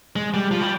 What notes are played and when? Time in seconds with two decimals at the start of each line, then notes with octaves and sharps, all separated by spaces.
0.16 G#3
0.34 G3
0.51 F3
0.61 G3